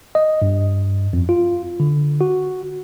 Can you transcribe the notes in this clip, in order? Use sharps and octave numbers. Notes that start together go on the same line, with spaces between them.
D#5
G2
F2
F4
D3
F#4